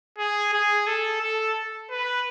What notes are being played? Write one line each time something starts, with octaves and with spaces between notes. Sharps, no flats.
G#4
G#4
A4
A4
B4